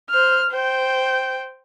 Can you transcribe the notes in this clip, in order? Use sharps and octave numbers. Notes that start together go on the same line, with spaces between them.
C5 F6
C5 G5